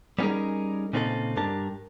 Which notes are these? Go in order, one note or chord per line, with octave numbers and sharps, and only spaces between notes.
G3 B3 C#4 D#4 G#4 A#4
A#2 C#3 C4 D#4 F#4 A4
G2 D4 G4 A#4 A5